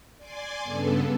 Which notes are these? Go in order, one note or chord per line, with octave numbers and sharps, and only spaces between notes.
D5 G#5 C6 D6
G2 C#3 B3 A4